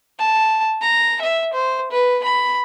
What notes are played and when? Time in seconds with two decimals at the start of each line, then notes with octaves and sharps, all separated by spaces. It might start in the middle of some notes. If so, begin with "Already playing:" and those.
0.19 A5
0.82 A#5
1.21 E5
1.53 C5
1.91 B4
2.24 B5